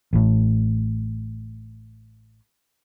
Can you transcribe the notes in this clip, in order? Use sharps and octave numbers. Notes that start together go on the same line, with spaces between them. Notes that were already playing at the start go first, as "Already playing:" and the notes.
A1 A2